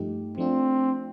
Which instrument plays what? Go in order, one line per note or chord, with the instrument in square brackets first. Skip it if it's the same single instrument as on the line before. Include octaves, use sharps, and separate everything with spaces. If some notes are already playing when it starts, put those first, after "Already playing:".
Already playing: [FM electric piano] G2 F3 A3 D#4 G4
[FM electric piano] F3 A3 D4 F4 [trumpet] C4